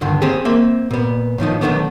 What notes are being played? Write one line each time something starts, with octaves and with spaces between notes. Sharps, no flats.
C#2 G2 D3 D#3
C4 G4 G#4
A#3 C4 E5
A#2 B3
A2 D#3 F3 D#4
B1 A2 D#3 A3 B3 D4